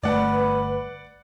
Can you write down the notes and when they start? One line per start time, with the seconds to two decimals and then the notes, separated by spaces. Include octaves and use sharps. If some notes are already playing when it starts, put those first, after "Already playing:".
0.03 G1 A3 B4 D5 F#5